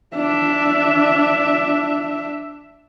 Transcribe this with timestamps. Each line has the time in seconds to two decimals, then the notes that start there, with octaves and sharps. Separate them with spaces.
0.15 D4 E5